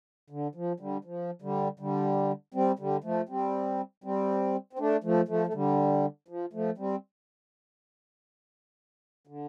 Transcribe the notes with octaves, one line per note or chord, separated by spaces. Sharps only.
D3
F3
D3 G3
F3
D3 G3
D3 G3
G3 C4
D3 G3
F3 A3
G3 C4
G3 C4
C4
A3 D4
F3 A3
F3 A3
A3
D3 G3
F3
F3 A3
G3 C4
D3